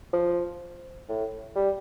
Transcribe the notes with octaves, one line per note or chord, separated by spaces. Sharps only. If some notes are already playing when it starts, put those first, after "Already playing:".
F3
A2
G3